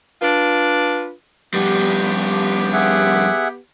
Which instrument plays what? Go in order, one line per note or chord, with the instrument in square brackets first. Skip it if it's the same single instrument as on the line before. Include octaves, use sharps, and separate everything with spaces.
[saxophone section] D4 F4 B4
[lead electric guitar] F2 G3 [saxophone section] B3 G4
[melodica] G#4 E5 F#5